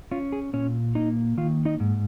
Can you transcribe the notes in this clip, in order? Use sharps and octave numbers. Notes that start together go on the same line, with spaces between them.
C#4 F4
G#4
A#2 C#4 C#5
A#3 D#4 D#5
D#3 F4 F5
D#4 D#5
G#2